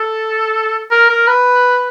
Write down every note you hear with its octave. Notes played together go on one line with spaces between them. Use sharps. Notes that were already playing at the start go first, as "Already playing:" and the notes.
Already playing: A4
A#4
A#4
B4